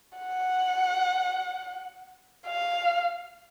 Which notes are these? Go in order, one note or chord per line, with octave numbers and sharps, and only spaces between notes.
F#5
F5